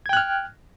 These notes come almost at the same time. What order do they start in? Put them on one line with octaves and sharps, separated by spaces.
G#6 G5 F#6 F6